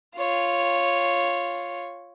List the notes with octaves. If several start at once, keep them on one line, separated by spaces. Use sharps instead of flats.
F4 C#5